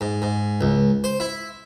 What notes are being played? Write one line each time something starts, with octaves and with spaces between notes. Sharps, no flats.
G#2
G#2
C#2
C5
E4